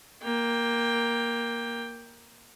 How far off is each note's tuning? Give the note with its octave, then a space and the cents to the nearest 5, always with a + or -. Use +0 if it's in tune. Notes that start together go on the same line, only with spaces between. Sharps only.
A#3 +5 G5 +15